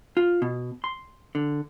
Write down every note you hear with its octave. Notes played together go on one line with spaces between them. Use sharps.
F4
B2
C6
D3